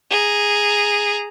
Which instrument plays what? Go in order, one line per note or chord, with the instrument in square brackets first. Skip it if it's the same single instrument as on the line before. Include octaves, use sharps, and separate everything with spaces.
[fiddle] G#4 A#5